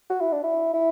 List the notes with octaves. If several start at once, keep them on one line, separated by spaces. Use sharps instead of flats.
F#4
E4
D4
E4
E4